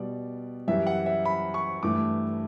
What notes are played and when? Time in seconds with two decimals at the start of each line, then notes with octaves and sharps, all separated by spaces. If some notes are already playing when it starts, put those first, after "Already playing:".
Already playing: B2 G3 D5
0.68 F#2 E3 G3 E5
0.87 F#5
1.06 E5
1.25 B5
1.54 C#6
1.83 G2 E3 A3 D6